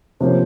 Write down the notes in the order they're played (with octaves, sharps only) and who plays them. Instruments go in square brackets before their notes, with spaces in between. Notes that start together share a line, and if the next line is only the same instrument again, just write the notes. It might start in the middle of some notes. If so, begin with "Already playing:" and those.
[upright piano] C3 F3 A#3 C#4 [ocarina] C5